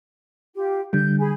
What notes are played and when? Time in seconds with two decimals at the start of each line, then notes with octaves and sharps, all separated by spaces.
0.55 F4 G4
0.93 D3 G3 G6
1.19 G#4 G#5 B5